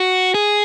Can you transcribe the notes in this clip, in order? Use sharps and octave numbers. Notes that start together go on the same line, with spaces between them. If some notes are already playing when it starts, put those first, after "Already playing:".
Already playing: F#4
G#4